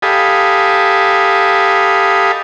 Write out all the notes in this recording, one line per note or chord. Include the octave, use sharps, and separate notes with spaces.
G4 A4 D#5 F5 G#5 B5